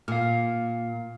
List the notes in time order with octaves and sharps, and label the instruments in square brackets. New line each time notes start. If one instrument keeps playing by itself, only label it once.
[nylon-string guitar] A#2 [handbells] F5 F6